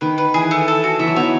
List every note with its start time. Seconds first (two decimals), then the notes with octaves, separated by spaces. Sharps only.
0.01 D#3 B4
0.18 B4
0.34 E3 G#4
0.51 A3
0.68 A4
0.84 F#4
0.99 E3 E5
1.08 F#3
1.16 B3 D#4 C#5